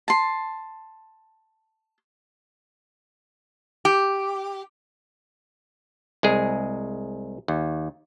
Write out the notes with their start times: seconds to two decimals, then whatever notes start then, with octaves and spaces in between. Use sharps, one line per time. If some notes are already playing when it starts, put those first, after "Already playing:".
0.08 A5 C6
3.85 G4
6.23 C2 G#3 G#4
7.48 D#2